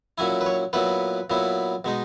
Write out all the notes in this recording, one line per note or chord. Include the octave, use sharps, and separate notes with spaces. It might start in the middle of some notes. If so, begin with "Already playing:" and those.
A#2 F#3 C#4 E4 G#5
B4
C#5
A#2 F#3 B3 E4 B4
A#2 F#3 B3 E4
B2 G#3 D#4